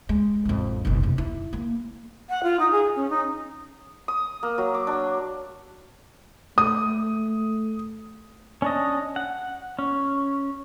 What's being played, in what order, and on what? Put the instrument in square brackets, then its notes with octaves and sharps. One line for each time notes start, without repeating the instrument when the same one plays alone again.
[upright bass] G#3
A1 F2
F#1 B1
E2 C3
E4
A#3
[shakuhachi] F#5
F4
D#4
G#4
C#4
D#4
[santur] D#6
A#3
F#3
D6
D4
[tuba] A3 [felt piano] D#6
[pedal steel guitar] C#4 D4 D#5
F#5
C#4